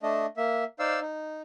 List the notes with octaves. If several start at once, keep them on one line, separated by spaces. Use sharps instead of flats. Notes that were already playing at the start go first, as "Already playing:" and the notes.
A3 D4 D#5
A#3 E5
D#4 C5 D5 F5 E6
D#4